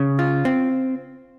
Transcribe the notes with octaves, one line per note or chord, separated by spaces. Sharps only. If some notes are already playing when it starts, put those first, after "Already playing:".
Already playing: C#3
F4
C4